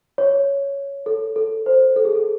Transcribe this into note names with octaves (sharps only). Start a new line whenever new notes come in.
C#5
A4
A4
C5
A4
G#4
A4